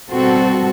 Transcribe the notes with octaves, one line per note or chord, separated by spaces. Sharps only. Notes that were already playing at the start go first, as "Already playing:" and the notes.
B2 G3 C4 F#4 A4